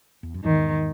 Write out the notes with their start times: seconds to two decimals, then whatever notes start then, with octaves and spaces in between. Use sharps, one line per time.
0.23 E2
0.34 F#2
0.44 E2 G#2 D#3